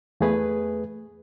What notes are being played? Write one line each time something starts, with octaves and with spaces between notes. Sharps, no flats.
E2 A3 G#4 B4